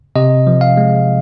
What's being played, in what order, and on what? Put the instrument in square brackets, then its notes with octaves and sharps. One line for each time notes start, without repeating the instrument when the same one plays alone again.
[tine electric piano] C3 D#5
F3
F5
G#3